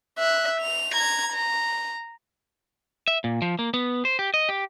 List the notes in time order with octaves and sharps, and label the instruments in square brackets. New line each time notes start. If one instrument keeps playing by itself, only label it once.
[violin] E5 F#6
F7
A#5 G#6
A#5
[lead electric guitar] E5
A#2
F3
A#3
B3
C5
G4
D#5
G4